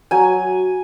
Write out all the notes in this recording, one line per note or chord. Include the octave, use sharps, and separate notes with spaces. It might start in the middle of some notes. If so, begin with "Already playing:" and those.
F#3 G#5